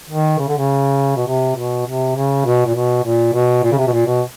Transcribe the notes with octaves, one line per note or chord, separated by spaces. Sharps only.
D#3
C#3
D3
C#3
B2
C3
B2
C3
C#3
B2
A#2
B2
A#2
B2
A#2
C#3
C3
B2
A#2
B2